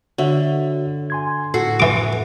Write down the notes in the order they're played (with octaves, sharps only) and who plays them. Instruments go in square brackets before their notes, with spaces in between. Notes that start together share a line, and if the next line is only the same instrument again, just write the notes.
[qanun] D3 [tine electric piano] F#4 C#5 E5
[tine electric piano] G#5 C6 G#6
[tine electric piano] A2 A4 C7 [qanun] F#4
[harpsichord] E3 D6